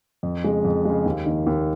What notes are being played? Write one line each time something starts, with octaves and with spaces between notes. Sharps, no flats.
F2
C#3 G#3
F2
C#3 G#3
D#2
D#3 A#3
D#2